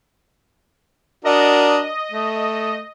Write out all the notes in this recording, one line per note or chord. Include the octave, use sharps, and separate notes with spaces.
D4 F#4 A#4 D#5
A3